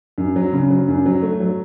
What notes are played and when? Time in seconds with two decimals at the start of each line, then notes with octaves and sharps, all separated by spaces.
0.18 F#2
0.36 F#3
0.53 C#3
0.70 F#3
0.88 F#2
1.06 F#3
1.22 A3
1.40 F#3